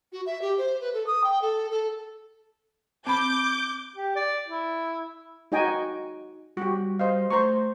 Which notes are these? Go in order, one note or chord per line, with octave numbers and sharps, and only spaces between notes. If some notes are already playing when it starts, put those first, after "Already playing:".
F#4
E5
G4
C5
B4
A4
D#6
G5
A4
A4
C4 B5 D6 G6
G4
D5
E4
D#4 F#4 D#5 G5 G#5
G3 F#4 G4
C5 D#5 F5
A3 C5 A#5 C#6